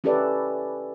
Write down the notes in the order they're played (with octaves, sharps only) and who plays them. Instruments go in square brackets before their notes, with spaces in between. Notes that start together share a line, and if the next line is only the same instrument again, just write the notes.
[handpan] C#4 E4 G4 A4 B4 D5